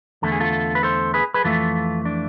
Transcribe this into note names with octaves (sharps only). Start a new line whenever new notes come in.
E2 D3 A3 A4
G#4
F4 A4
B4
A4 C5
G#4 B4
G#4 B4
F2 E3 A3 F4 A4
D4